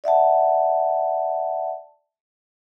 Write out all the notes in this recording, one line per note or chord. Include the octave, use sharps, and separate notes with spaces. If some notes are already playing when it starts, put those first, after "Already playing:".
D5 E5 F#5 A5